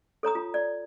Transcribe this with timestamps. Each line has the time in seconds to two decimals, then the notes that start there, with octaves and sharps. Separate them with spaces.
0.23 A4 C#5 A#5 D#6
0.35 F4
0.54 D5